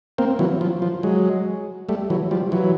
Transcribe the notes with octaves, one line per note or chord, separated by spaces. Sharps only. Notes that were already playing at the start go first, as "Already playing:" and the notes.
A#3 C4
E3 F#3
F3
F3
F#3 G#3
G3 A3
E3 F#3
F3 G3
E3 F#3